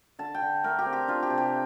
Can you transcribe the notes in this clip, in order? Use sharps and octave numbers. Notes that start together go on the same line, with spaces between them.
D3 A5
G5
D3
A3 A#4
G4
C4
G4
D4 F4
G4
C3
G4